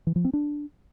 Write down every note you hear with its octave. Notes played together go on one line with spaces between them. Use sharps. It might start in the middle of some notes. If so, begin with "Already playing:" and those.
E3
F3
C4
D4